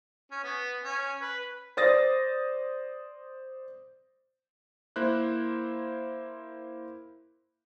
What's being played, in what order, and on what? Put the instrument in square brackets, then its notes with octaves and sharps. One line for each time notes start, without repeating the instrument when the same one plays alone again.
[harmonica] C#4
B3
C#4
B4
[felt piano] C5 D5 D#6 A6 A#6
[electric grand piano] A#3 E4 C5 F#6